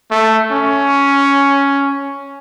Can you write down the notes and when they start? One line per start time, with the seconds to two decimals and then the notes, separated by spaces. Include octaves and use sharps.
0.11 A3
0.51 C#4